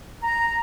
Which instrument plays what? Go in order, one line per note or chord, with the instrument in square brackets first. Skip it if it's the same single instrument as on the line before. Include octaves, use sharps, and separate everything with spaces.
[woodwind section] A#5